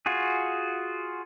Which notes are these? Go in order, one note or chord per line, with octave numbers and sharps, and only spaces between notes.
F4 F#4 G#4